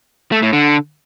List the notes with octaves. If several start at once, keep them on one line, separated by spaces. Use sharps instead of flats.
A3
A2
D3